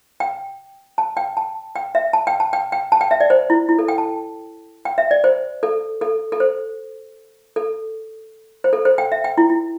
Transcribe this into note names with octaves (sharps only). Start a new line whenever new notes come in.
G5
A5
G5
A5
G5
E5
A5
G5
A5
G5
G5
A5
G5
E5
D5
C5
E4
E4
A4
G5
A5
G5
E5
D5
C5
A4
A4
A4
C5
A4
C5
A4
C5
G5
E5
G5
E4
E4